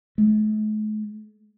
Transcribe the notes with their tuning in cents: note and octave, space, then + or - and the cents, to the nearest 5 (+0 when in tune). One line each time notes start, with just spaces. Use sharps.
A3 -45